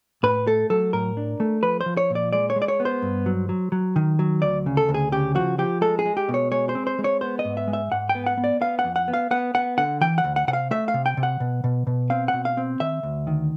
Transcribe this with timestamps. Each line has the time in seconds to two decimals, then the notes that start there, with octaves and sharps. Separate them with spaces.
0.23 A2 B4
0.47 A3 A4
0.70 F#3 A4
0.93 A2 A#4
1.17 D4
1.40 A3
1.63 F3 B4
1.81 C5
1.86 F3
1.97 C#5
2.10 A#2
2.15 D5
2.33 G#3 D5
2.50 C#5
2.56 G#3
2.62 D5
2.68 C#5
2.80 B3
2.85 C5
3.02 G2
3.26 F#3
3.49 F#3
3.72 F#3
3.96 D#3
4.19 F#3
4.42 D2 D5
4.66 C#3
4.77 A4
4.89 D2
4.94 G#4
5.12 C#3 G4
5.35 F3 F#4
5.58 F3 G4
5.81 G#3 A4
5.99 G#4
6.06 G#3
6.17 G4
6.29 B2
6.34 C#5
6.51 G#3 C#5
6.69 C5
6.75 C4
6.87 C5
6.99 G#3
7.04 C#5
7.21 B3 C5
7.39 D#5
7.45 G#2
7.57 E5
7.68 G#3
7.73 E5
7.92 G#2 F#5
8.09 G5
8.15 B3
8.26 F#5
8.37 B3
8.44 D5
8.61 B3 F5
8.79 F#5
8.84 F2
8.96 F#5
9.08 B3
9.13 F5
9.31 B3 F#5
9.54 B3 F#5
9.78 D3 F#5
10.01 E3 G5
10.18 F#5
10.24 D2
10.36 F#5
10.48 C3 F#5
10.53 F5
10.71 A3 E5
10.88 F5
10.94 C3
11.06 G5
11.17 C3
11.23 F#5
11.40 B2
11.64 B2
11.87 B2
12.10 C4 F5
12.28 F#5
12.33 B2
12.45 F5
12.57 C4
12.80 D#3 E5
13.03 D2
13.27 D#3